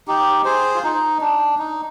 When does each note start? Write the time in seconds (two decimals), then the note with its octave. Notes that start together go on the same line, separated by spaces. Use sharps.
0.08 D#4 G4
0.45 G#4 C5
0.75 F4
0.84 D#4
1.21 D4
1.59 D#4